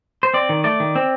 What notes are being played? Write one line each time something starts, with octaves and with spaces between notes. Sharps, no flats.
C5
C4 D5
D#3
A3 D5
D#3
C4